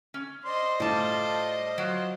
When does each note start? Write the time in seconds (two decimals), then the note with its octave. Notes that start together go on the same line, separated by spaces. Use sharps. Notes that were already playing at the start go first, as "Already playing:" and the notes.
0.14 C#4
0.45 C5 D5 D#5 C6
0.80 A2 G3 F4 A4 D5 A5
1.78 F#3 F4